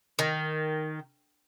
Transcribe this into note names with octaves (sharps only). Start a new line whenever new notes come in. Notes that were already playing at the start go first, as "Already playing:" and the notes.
D#3